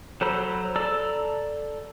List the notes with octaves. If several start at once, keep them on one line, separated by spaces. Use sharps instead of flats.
F#3 A4 C5 A#5 B5
A4 D5 A#5 E6